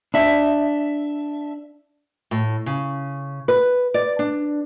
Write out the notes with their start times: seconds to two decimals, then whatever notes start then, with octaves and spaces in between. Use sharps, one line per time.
0.14 D4 E5
2.31 A2
2.66 C#3
3.48 B4
3.94 D5
4.19 D4